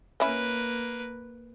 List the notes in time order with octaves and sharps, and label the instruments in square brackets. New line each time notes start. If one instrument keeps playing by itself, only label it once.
[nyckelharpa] A#3 B4 [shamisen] C#4 E4